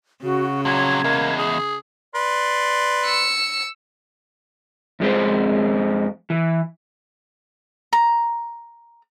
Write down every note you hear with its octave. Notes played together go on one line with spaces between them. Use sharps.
C#3 F#4
F2 A#2 F#3 G#6
E2 G#3 A#3
G#4
B4 D5 C6
E6 C#7
F2 G#3 C4 C5
E3
A#5